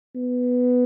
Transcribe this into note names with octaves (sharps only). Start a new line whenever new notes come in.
B3